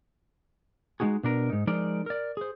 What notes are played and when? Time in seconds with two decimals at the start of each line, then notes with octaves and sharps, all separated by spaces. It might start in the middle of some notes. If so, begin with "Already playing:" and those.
1.00 G#3 A3 D#4 F#4 G#4
1.23 B2 D4 A#4
1.50 G#2 D#4
1.67 F3 G#3 D#4 A#4 D5
2.06 A#4 D5
2.37 G#4 C5